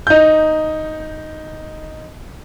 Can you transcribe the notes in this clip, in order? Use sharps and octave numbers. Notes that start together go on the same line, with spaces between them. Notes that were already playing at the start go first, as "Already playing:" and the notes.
D#4 G6